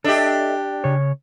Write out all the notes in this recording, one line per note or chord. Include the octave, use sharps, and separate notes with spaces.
D4 G4 A4 D#5 E5
C#3 C#5